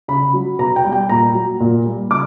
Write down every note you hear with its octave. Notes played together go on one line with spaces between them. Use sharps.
C#3 B5
F#3
B2 A#5
G5
G3
G5
A#2 A#5
F#3
A#2
G3
C#3 D6